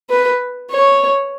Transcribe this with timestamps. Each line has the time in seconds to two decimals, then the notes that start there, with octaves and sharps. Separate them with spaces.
0.10 B4
0.70 C#5